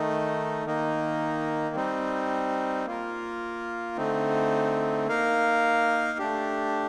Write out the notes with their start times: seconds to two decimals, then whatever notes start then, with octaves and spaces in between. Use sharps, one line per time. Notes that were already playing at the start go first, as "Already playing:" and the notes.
Already playing: D#3 A3 D#4
0.65 D#3 A#3 D#4
1.75 G3 C4 D#4
2.86 A#3 F4 A#4
3.97 D3 A3 C4 D#4
5.07 A#3 D#4 A#4 F5
6.19 A3 D4 G4